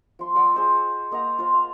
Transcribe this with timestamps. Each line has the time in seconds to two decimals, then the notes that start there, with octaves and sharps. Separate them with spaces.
0.19 F3 C6
0.35 D5 F#5 E6
0.54 G#4 C5 D#5
1.11 A#3 D#5 F#5 A#5
1.38 F4 C5
1.54 F5